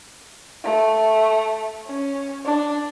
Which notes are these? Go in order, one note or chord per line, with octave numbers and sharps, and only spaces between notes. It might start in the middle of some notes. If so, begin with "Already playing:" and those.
A3
C#4
D4